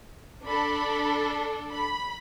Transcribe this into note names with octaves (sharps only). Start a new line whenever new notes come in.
D4 A4 B5
B5